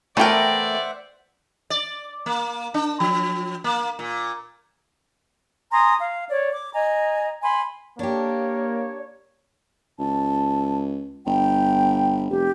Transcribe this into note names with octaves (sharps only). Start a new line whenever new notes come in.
E3 A3 A#4 C5 D5 E5 F#5 G5
D5
A#3
D4
F3
A#3
A#2
G#5 A#5 C6 D#6
F5
C#5 D5
D6
D#5 G#5 A#5
G#5 B5 C6
A#3 D4 G4 C#5
C#2 A5
G1 G5
F1 G4